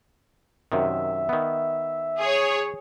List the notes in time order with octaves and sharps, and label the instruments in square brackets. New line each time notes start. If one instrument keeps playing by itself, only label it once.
[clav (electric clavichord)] F#2 C3 D#3 [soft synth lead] E5
[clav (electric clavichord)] D#3 B3
[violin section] G#4 C#5